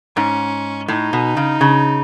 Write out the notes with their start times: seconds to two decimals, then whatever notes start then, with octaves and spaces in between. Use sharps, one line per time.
0.16 G#2 C#4
0.88 A2 D#4
1.13 B2
1.37 C#3
1.61 C#3